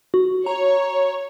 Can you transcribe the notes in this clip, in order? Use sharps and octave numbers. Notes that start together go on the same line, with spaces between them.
F#4
C#5 A#5